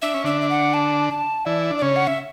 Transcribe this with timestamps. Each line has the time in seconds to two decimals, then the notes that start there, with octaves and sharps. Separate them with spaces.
0.02 D4 E5
0.14 C#4
0.24 D3 D4 E5
0.41 E5
0.50 F#5
0.74 A5
1.10 A5
1.45 E3 E4 D5
1.70 D4
1.78 D5
1.82 C#3 C#4 C#5
1.96 F#5
2.07 E5